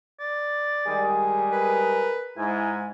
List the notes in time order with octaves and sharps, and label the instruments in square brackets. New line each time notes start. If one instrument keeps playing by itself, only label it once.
[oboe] D5
[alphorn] D#3 [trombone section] G3 G#3 G#4
[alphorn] A#4 [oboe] B4
[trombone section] G#2 [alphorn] E4 [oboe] G#5